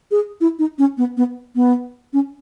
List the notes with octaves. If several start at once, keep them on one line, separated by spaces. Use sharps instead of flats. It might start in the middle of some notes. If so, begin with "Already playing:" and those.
G#4
E4
D#4
C#4
B3
B3
B3
C#4